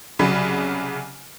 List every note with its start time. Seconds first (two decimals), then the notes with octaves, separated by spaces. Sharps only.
0.19 C2 C#3 F#3 B5